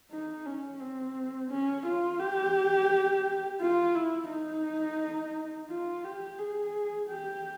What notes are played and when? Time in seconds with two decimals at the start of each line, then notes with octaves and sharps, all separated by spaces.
0.11 D#4
0.46 C#4
0.80 C4
1.50 C#4
1.85 F4
2.20 G4
3.60 F4
3.95 E4
4.30 D#4
5.70 F4
6.04 G4
6.38 G#4
7.08 G4